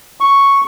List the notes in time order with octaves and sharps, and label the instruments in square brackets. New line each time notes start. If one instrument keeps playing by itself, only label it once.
[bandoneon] C#6